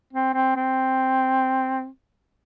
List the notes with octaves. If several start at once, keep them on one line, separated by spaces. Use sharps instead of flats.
C4
C4
C4